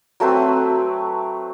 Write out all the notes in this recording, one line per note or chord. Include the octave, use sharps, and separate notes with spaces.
F#3 A3 C4 B4